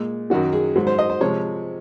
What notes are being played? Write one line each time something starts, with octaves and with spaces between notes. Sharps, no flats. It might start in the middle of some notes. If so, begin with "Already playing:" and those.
Already playing: A#2 G#3
F#2 D#3 F#3 F#4
G#4
G#2 F#3
C5
D#5
C5
C3 F3 G#3 C#5